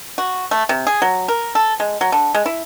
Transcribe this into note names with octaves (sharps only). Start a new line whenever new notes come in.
F#4
A3
C3
G#4
F#3
A#4
A4
G#3
F#3
D3
G#3
E4